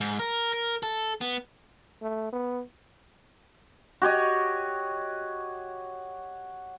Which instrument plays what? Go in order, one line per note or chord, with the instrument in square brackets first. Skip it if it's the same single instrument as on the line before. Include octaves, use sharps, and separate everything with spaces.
[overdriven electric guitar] G#2
A#4
A#4
A4
B3
[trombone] A3
B3
[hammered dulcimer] F#4 G4 C#5 D#5